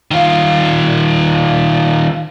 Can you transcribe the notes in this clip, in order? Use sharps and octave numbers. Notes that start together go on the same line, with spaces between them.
D#3 F4